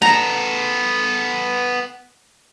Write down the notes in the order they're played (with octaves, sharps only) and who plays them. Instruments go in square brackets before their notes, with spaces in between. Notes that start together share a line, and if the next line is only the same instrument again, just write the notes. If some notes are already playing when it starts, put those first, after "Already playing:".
[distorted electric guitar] B3 A4 [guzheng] A#5